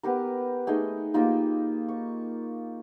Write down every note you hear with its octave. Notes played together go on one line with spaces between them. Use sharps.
B3 G4 A#4
A3 D#4 G#4 G5
A#3 D#4 F4 G4
C#6